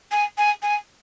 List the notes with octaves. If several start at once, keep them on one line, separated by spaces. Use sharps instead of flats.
G#5
G#5
G#5